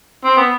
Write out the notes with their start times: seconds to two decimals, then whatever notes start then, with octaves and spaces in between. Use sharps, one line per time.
0.25 C4
0.37 B3